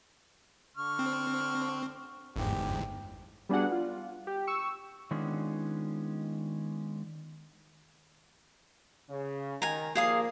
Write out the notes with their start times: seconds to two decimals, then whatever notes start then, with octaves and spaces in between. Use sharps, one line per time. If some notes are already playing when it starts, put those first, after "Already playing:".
0.77 D3 C#6 F6
0.99 C4
2.36 G1 E2 G#2 G4
3.49 G3 B3 D4 F#4 G#4 F#5
3.72 F4
4.27 G4
4.47 C#6 E6
5.11 D#3 G#3 B3 C#4 D4 F4
9.10 C#3
9.62 D#3 G#5 A#5
9.95 A#2 F3 A#3 G#4 F5 D#6